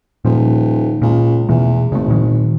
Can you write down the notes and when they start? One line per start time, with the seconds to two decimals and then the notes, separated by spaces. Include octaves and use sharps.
0.25 D#1 A#2 F3
1.02 C#2 A#2
1.49 E2 B2 E3 A3
1.92 G#1 C#3 A3
2.08 A#2 D#3 F#3